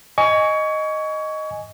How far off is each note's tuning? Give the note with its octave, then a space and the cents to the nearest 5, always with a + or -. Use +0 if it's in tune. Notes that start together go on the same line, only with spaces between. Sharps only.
D#5 +0 G#5 +0 C#6 +25